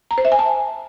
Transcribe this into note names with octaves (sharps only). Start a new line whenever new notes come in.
A#5
C5
E5
G#5
A5